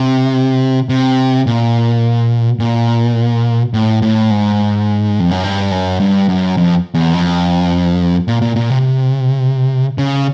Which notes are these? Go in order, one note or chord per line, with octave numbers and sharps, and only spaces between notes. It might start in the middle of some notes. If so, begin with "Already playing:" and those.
Already playing: C3
C3
A#2
A#2
A2
A2
G#2
F2
F#2
G2
F#2
G2
F#2
F2
E2
F2
A#2
A#2
A#2
C3
C#3